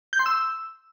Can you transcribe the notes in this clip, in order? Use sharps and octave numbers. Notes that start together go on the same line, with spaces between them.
G6
C6
E6